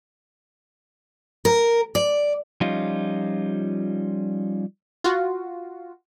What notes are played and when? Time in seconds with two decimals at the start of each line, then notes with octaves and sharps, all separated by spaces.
1.45 A#4
1.95 D5
2.61 F3 G3 C#4 D#4 F4
5.04 F4 F#4